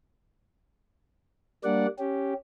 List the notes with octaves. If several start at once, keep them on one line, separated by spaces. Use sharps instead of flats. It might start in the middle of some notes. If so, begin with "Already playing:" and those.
G3 A#3 D4 D5 F#5
C#4 G4